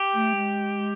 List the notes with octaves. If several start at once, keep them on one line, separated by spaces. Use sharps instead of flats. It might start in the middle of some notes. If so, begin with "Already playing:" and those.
Already playing: G4
A3
G#3